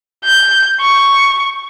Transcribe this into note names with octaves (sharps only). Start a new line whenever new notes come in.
G6
C#6